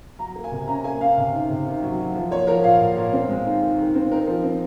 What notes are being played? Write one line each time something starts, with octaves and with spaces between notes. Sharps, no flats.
F#3 A#5
A#3
G#5
C3
C#4 A#5
A#3 G#5
C#4 F5
C3 F5
D#3
C3
D#3
F#3
F#3
F3
A#3 C#5
F3 A#4
A#2 F5
A#2
A#2
C4
G#3
D#3
D#3
D#3
C4
D#4 A#4
F3
C4